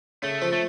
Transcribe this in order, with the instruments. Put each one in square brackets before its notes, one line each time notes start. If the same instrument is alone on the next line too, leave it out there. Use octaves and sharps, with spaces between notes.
[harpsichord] C#3 [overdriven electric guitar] A3
[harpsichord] F3
[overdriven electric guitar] A3